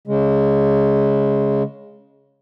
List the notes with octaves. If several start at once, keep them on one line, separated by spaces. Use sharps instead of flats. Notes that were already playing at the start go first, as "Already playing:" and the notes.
C#3 G#3